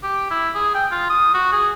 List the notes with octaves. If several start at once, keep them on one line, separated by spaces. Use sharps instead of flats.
G4
E4
G#4
G5
F4
D#6
F#4
G#4